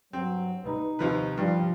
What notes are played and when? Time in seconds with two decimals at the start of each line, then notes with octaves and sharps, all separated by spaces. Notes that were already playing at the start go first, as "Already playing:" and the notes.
0.13 G2 F#3 C4
0.64 G3 D#4 B4
0.99 D#2 C3 F3 B4
1.37 G2 F3 G3